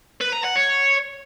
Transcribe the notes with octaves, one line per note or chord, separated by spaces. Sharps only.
B4
A#5
F#5
C#5